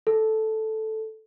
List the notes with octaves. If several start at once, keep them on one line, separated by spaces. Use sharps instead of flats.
A4